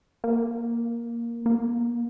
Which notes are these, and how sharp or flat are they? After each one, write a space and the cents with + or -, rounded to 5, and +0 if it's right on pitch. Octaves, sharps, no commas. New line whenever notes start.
A#3 +5
A#3 +30